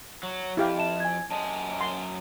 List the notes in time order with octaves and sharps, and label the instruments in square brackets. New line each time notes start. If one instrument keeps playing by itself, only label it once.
[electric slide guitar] F#3
[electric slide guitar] F2 [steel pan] E4 G4 F5
[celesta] E5 A5 E7
G#5 G#6
[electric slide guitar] F#2 D#5 G#5 [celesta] A5
[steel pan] C6